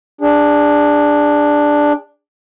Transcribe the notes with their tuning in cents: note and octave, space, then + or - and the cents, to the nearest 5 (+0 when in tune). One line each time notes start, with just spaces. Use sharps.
D4 +0 G#4 -35